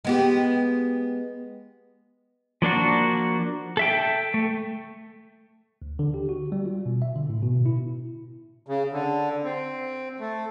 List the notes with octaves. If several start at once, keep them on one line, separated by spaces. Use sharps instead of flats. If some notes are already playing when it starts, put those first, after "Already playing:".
G#3 B3 G4
F3 A#3 D4 F#4
A4 E5 G5
A3
D2
D3
G4
F#4
G3
F4
B2
E5
D3
A2
B2
E4
C#3
D3
C4
A3